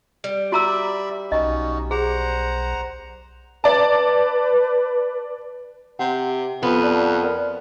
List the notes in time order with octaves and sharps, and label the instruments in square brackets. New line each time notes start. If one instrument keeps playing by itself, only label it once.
[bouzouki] G3
[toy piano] F#4 A#5 E6 [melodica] D5 E5 B5
[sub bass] B1 [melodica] C#4 D#4 F#4 [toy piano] D#5
[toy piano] G#4 [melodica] C5 F#5 A#5
[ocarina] B4 [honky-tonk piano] D5 A5
[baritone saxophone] C3 [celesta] F#5
[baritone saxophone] F2 [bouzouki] B3
[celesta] D5 A5
A#4 D5 F6